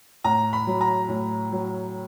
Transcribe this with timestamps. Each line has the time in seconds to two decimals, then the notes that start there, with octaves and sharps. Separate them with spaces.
0.24 A2 A#5
0.53 B5
0.67 F#3
0.81 A#5
1.09 A2
1.52 F#3